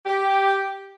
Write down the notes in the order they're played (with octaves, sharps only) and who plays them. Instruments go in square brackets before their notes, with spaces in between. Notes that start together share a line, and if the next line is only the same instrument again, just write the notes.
[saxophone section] G4